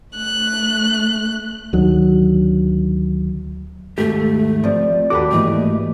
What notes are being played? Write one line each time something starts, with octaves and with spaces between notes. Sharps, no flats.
A3 F#6
D2 D3 D#3 F#3
D#2 G#2 A3 G4 A4
F3 C4 D5
D#2 F#4 G4 A4 B4 D6
G#2 E3 A3 A#3 D#5